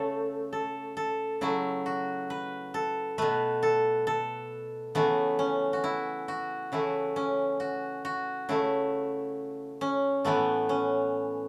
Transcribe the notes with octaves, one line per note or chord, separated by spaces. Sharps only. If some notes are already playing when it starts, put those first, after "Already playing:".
Already playing: C#3 A3 A4
A4
A4
C#3 F#3 A3 E4
F#4
B4
A4
B2 A3 B4
A4
A4
C#3 E3 A3 B3
C#4
F#4
E4
F#4
C#3 E3 A3 E4
C#4
F#4
F#4
C#3 A3 E4
C#4
A2 E3 A3 B3
C#4